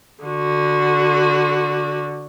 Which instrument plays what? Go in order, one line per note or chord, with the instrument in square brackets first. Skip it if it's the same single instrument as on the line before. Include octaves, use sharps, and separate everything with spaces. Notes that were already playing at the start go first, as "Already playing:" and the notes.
[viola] D3 F#4